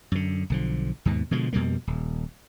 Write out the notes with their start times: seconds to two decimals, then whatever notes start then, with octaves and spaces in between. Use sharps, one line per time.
0.12 F#2 D3
0.50 B1 D3 F3
1.05 D#2 G#2 B2
1.31 B2 D3 F3 G#3
1.53 F2 B2 G3 A#3
1.87 D#1